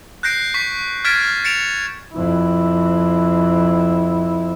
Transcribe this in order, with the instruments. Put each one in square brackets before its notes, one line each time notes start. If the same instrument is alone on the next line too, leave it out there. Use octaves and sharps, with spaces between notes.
[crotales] F#6 G6 A#6 C7 D7
C#6 B6
F6 G#6 A6 B6 D7 E7
F6
A6 C#7 D7 E7 F7
[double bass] F2 E4